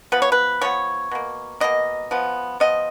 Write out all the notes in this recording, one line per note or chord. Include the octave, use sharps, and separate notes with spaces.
F3 B3 B4
C#5
B4
F3 B3 C#5
B2 A#3
B2 A#3 D#5
F3 B3
F3 B3 D#5